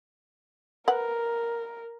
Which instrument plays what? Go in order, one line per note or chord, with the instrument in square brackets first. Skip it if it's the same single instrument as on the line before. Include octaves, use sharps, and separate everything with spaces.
[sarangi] A#4 [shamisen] B4 F#5